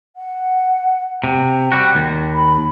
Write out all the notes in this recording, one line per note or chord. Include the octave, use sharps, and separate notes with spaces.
F#5
C3 G5
G3 F#4
D#2
B5